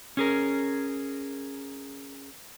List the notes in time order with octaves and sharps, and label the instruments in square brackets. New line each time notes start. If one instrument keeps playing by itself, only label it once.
[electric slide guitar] C#4 G#4 A#4